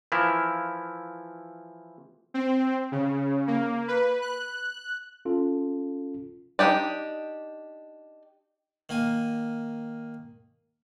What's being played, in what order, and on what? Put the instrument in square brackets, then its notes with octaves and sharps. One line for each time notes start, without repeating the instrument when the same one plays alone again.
[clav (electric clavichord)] E3 F3 E4 A#4
[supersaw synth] C4
C#3
A#3
B4
F#6
[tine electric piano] C#4 F4 A4
[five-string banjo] D4 D#4 G4 D5
[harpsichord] D#3 A#3 G#5